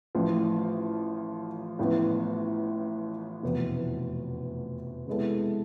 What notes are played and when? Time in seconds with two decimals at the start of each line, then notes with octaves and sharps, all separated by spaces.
0.15 A1 A2 F3
1.79 A1 A2 F3 B3
3.43 F1 E2 B2 B3
5.07 C3 G#3 B3 E4 A4